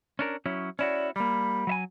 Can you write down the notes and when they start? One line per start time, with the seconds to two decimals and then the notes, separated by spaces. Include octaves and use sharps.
0.19 C#4 D4 A#4
0.46 F#3 C#4 E4
0.79 C#4 E4 F#4 D5
1.16 G3 A#3 B5
1.67 F#3 E5 G#5